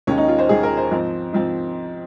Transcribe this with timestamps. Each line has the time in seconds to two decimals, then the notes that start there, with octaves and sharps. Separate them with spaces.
0.07 D#2 D#3 G#3 C#4
0.18 D#4
0.28 F4
0.39 C5
0.49 D#2 D#3 G#3 G#4
0.63 A#4
0.77 C5
0.91 G#2 F3 C4
1.33 G#2 F3 C4